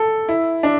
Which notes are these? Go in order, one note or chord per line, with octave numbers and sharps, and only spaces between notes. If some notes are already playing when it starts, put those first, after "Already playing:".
Already playing: A4
E4
D4